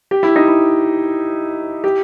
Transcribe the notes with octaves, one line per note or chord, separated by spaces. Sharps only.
G4
E4
D#4
E4
G4